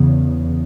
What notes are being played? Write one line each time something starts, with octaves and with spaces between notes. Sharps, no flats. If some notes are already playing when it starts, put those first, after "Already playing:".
Already playing: E2 C#3